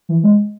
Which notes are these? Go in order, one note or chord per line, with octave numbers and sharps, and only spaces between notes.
E3
G#3